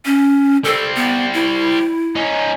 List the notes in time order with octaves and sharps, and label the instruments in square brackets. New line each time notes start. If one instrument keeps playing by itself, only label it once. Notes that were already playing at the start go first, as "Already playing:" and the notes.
[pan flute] C#4
[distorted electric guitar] G3 C4 [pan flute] A4
[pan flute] B3
E4
[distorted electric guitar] C#4 D#4